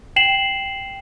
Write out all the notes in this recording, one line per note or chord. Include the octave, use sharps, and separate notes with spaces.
G5 C7 E7 F#7